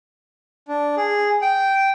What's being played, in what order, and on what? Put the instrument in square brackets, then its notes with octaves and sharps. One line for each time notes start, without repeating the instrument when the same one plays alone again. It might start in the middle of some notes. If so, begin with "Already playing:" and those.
[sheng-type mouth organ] D4
G#4
G5